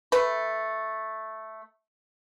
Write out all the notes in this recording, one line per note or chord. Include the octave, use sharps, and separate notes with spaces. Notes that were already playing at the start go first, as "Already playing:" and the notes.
A3 B4